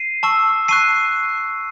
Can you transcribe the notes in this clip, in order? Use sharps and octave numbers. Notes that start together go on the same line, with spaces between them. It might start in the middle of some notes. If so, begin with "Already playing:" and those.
Already playing: C7 D#7
A5 C#6 E6
A5 C#6 F#6 C7 D#7